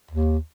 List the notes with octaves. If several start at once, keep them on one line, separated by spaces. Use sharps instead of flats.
D#2